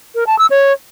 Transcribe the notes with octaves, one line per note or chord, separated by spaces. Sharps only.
A#4
A5
E6
C#5